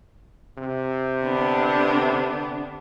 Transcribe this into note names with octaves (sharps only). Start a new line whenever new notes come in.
C3
D3 B3 D4